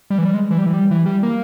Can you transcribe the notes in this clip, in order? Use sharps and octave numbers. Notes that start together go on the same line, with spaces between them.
G3
E3
G3
G#3
E3
G3
E3
G3
E3
G3
A#3